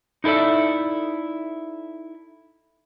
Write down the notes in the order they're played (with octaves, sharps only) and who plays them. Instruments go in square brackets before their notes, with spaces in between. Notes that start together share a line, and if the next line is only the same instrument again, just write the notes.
[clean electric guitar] D#4 E4 A4 D5 E5